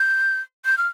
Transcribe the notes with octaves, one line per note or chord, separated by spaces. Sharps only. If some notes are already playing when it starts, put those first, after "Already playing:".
Already playing: G6
G6
F6